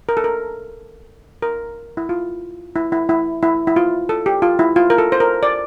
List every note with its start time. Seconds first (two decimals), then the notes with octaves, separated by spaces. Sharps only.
0.09 A#4
0.17 A4
0.24 A#4
1.42 A#4
1.97 E4
2.09 F4
2.76 E4
2.92 E4
3.09 E4
3.43 E4
3.67 E4
3.76 F4
4.09 A4
4.26 G4
4.42 F4
4.59 E4
4.76 F4
4.90 A#4
4.98 A4
5.12 C5
5.20 A#4
5.43 D5